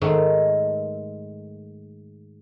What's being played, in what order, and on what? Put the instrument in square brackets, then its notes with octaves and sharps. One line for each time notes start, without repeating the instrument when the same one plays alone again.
[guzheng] G#2 D#3 G#3 A3